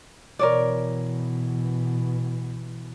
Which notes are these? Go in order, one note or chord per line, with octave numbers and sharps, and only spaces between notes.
B2 E3 A#4 C#5 D5